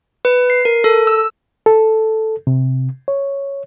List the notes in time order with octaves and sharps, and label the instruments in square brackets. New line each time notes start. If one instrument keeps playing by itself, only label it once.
[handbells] B4
C7
A#4
A4
E6
[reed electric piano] A4
C3
C#5